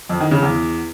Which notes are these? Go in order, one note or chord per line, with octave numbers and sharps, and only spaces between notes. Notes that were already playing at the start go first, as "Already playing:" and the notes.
F2
D#3
C#3
E2